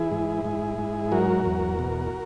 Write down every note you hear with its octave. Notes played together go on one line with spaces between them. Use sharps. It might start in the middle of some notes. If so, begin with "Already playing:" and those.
Already playing: E3 E4 G#4
G#2
G#2
G#2
F#3 F#4 A#4
E2
B2